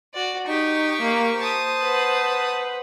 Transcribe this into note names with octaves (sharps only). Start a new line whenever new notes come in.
F#4 D5
D#4 G4 C#6
A#3
C5 A5 D#6
B4 F#5